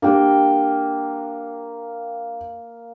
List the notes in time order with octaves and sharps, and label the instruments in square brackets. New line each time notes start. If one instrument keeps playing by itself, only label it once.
[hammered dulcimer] A#3 G5 [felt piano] D4 G4